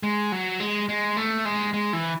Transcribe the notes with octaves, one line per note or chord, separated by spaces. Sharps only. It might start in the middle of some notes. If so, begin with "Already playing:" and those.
G#3
F#3
G#3
G#3
A3
G#3
G#3
E3